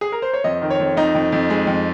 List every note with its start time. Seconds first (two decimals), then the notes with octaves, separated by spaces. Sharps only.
0.01 G#4
0.12 A#4
0.22 C5
0.33 C#5
0.44 F2 D#5
0.62 D#3
0.70 C#5
0.80 F2
0.97 F2 D#4
1.15 F2
1.32 F2
1.50 G#3
1.67 F2